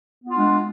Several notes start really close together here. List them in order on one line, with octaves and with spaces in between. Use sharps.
B3 F4 D4 G#3